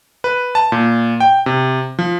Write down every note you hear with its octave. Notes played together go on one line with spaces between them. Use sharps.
B4
A5
A#2
G5
C3
F3